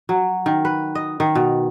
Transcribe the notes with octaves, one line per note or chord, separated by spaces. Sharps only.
F#3
D#3
B4
D#5
D#3
B2